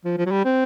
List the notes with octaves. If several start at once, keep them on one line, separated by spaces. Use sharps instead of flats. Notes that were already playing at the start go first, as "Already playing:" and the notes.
F3
F3
F#3
G3
C4